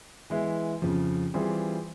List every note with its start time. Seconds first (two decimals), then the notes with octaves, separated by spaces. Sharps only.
0.30 E3 G#3 B3 E4
0.82 F2 C#3 F3
1.34 E3 G3 C4 F4 G#4